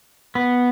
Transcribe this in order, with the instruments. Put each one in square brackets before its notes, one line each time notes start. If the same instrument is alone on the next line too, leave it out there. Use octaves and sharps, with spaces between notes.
[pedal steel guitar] B3